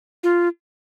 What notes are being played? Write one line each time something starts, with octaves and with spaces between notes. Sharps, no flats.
F4